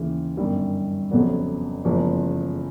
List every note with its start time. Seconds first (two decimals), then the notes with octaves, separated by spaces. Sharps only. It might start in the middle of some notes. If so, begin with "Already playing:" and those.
Already playing: D#2 C#3 E3
0.37 G1 F#2 D#3 G3
1.11 F1 F2 C#3 F#3 B3
1.85 F#1 E2 C#3 F3 G#3